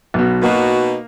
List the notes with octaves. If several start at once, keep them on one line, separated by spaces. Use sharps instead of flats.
B1 B2
B2 A#3 D#4 F#4